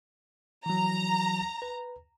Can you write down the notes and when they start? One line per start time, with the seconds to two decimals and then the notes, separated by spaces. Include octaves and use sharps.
0.66 E3 F#3 A#5
1.62 B4